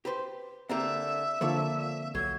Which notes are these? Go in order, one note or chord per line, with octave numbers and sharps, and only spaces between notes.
G4 B4 C5
D3 A#3 C4 G4 E5
D3 F3 A#3 A4 C#5 D5
B1 F#3 G#6